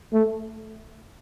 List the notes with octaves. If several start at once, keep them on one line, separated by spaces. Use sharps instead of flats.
A3